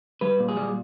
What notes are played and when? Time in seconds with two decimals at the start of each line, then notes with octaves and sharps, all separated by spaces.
0.21 G3 B4
0.40 A#2
0.49 G#4
0.57 G3